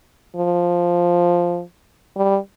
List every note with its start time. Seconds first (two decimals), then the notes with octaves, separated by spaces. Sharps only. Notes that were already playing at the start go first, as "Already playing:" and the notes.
0.36 F3
2.16 G3